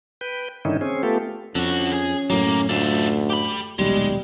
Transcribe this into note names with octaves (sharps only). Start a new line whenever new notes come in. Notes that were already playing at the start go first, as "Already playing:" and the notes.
B4 G5
G2 D3 D#3 C#4 D#4 E4
C4 C#4 G#4
A3 B3 F4 G4 A4
F2 D3 C#4 F#4
G#4
B1 F#2 A2 F#3 A#3
D2 A3 F4
G4 B5
D#1 B1 G3 G#3